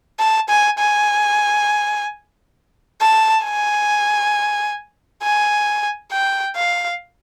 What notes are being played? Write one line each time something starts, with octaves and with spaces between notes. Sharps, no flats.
A5
G#5
G#5
A5
G#5
G#5
G5
F5